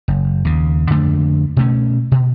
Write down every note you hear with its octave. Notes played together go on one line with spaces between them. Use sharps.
F#1
D#2 C#3
F2 D3 A3 D4
B2 A3 C#4
B2